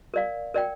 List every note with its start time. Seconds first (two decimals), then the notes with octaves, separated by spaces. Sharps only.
0.14 A#4 D5 F5
0.54 A#4 D5 G5